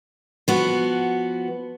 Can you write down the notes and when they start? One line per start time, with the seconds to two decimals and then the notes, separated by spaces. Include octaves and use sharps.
0.48 F3 B3 F#4